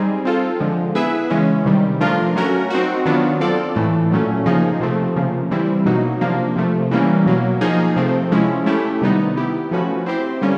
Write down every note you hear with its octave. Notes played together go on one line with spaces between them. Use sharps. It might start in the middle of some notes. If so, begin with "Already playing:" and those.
Already playing: G3 C4 D#4 G#4
C4 F4 A4
D3 F3 G#3
B3 E4 G#4 B4 E5
C#3 E3 G#3 C#4
C3 D#3 G3
F3 A3 D4 F4 A#4
F#3 A3 C#4 F#4 A#4
C4 D#4 F#4
D#3 F#3 B3 D4 F4
C4 F4 A4 D5
A2 E3 A3
A#2 F#3 A3 C#4
C#3 F3 A#3 D#4 G#4
C3 F3 A3 C4
C#3 F3 A#3
E3 G3 C4 E4
B2 F#3 A#3 D#4 F#4
C3 F3 A#3 D4
C3 F3 A3
E3 G3 A#3 C#4
B2 F#3 A#3
F3 A#3 D#4 G#4
C3 F3 A3 C4
F3 G#3 C#4 E4
A3 C#4 E4 G4
C3 D#3 G3 B3 D#4
B3 E4 G4
F3 A3 C#4 F#4 B4
C4 E4 G4 C5
D3 G3 A#3 C#4